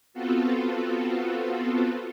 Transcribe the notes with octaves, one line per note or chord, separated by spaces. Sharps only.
B3 C4 F4 F#4 A4